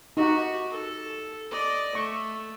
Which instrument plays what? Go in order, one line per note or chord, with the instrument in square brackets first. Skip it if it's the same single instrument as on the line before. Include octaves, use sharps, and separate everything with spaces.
[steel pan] D#4 F#5 [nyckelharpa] F#4 G4
[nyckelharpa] A4
D5 D#5
[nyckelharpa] A3 [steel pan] C#6